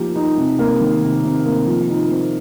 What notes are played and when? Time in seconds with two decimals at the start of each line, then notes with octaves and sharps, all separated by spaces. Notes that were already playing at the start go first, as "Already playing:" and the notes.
Already playing: F3 A#3 D#4 G4
0.16 D#4
0.37 C3
0.59 A#3
0.81 D#3
1.02 C3
1.25 C3
1.45 A#3
1.67 F3
1.89 D#4
2.11 C4